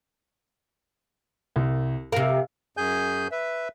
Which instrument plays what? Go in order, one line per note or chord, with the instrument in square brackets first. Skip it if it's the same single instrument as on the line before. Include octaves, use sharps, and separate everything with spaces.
[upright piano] C2
[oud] C3 A#4 [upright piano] F5
[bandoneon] F#2 G#4 G#5 G6
B4 E5